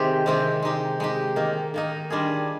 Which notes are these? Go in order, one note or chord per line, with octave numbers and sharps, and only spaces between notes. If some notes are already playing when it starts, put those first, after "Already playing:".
Already playing: C3 D#3 G#3 C4 G4
C3 D#3 G#3 C4 G4
G#3 D#4 G4
G#3 D#4 G4
D#3 A#3 D#4
D#3 A#3 D#4
D#3 G3 D4 F4 G#4